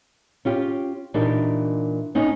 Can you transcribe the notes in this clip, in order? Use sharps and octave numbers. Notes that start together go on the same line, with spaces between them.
C#4 F4 G4
A#2 E3 D4 D#4 G4 A#4
B3 C#4 D#4